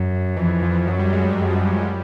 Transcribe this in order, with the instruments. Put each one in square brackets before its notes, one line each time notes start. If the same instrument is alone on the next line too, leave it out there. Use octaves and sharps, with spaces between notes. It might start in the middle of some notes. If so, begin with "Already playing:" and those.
Already playing: [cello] F#2
[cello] F2 [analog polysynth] E3
[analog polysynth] E3
F3
[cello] F#2 [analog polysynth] F#3
[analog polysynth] G3
G#3
G#3
[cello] F#2
[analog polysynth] F3
F#3
G3